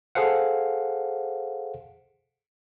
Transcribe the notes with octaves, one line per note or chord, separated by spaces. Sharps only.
G#4 A4 C5 F5 F#5